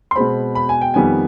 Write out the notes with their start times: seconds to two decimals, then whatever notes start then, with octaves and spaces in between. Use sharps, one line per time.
0.11 C6
0.16 B2 G#3 C4 B5
0.55 B5
0.69 G#5
0.81 G5
0.94 F2 D#3 G3 B3 G#5